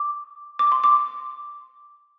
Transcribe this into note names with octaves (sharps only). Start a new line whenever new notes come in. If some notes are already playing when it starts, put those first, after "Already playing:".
Already playing: D6
D6
C6
D6